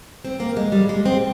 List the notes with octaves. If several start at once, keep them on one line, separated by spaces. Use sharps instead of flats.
C4
A#3
G#3
G3
G#3
C4